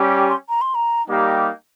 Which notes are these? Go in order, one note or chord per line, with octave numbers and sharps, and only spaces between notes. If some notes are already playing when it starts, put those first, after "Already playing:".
Already playing: G3 C#4 G4
C6
A#5
C6
A#5
G3 A#3 D#4 G4